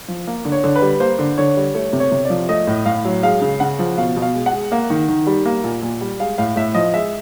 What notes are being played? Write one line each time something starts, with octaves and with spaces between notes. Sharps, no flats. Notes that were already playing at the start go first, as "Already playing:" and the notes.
F3
A#3
D3
C#5
D3
B4
G3
A#3 C5
D3
D3 C#5
G3
A3 C#5
C3
C#5
C3
D5
F3
A3 D#5
A2
A2 F5
F#3
G#3 F5
C#3
C#3 F#5
F3
B2 F5
B2
F5
G#3
F#5
G#3
A#3
D#3
D#3
G3
A#3
A#2
A#2
G3
G#3 F5
A2 F5
A2 E5
F3 D#5
G#3 E5